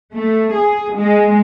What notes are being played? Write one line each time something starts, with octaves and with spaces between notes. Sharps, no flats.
A3
G#4
G#3